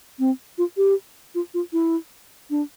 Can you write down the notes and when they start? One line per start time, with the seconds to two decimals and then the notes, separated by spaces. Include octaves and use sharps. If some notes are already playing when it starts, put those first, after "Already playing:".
0.19 C4
0.58 F4
0.77 G4
1.35 F4
1.54 F4
1.73 E4
2.50 D4